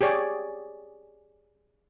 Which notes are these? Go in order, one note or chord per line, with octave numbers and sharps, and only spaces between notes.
G4 G#4 C#5 D5